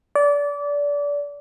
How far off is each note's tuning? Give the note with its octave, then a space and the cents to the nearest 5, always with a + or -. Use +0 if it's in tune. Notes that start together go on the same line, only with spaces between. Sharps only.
D5 -25